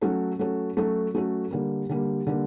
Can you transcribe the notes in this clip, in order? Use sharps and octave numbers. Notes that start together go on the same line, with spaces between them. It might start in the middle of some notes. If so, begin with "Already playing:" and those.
F#3 A3 C#4 F#4 A4
F#3 A3 C#4 F#4 A4
F#3 A3 C#4 F#4 A4
F#3 A3 C#4 F#4 A4
D3 G3 A#3
D3 G3 A#3
D3 G3 A#3